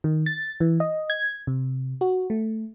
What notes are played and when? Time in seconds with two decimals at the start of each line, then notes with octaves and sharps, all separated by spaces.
0.04 D#3
0.26 A6
0.60 E3
0.80 D#5
1.10 G#6
1.47 C3
2.01 F#4
2.30 A3